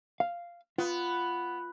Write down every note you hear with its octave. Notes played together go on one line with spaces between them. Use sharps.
F5
B3 F4